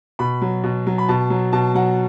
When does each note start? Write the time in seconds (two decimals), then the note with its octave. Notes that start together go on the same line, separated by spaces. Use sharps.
0.19 B2 B5
0.42 F#3
0.64 B2
0.87 F#3
0.98 B5
1.08 B2 A5
1.30 F#3
1.52 B2 A5
1.74 F#3 F#5